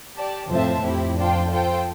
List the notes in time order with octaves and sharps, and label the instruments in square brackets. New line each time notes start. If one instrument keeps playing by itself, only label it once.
[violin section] G4 D5 A5
[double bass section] F2 A2 [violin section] C4 F4 C5 E5 A5
[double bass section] F2 [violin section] C4 E4 G4
[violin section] D4 F4 C5 G5
F4 A4 C5 G5